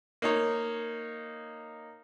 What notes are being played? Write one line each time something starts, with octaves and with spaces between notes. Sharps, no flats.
A#3 D#4 C#5